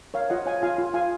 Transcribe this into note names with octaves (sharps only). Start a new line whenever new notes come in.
A#4 C#5 F5
F4 D#5 F#5
C#5 F5 G#5
F4 F5 G#5
F4
F4 F5 G#5